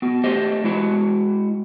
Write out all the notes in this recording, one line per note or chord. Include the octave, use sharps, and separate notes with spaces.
B3 F#4
A3 G4 C5 D#5
G#3 E4 F#4